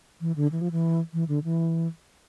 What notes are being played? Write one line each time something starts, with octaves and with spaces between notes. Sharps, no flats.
E3
D3
E3
F3
E3
E3
D3
E3